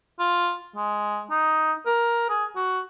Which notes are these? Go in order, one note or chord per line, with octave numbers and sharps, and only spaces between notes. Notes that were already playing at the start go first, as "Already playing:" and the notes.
F4
G#3
D#4
A#4
G#4
F#4